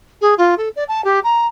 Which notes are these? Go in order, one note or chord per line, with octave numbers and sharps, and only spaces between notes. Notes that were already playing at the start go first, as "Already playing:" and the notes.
G#4
F4
A4
D5
A5
G4
A#5